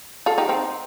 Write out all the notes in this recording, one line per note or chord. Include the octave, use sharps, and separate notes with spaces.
F4 A4
D#4 G4
C4 D#4